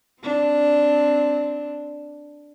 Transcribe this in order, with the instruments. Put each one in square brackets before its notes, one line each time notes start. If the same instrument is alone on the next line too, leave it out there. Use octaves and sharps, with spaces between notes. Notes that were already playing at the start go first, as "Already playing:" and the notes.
[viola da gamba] C4 D4